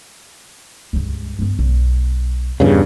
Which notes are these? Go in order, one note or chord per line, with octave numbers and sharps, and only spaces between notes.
C#2 G2
G2 B3
B1
E2 G2 C#3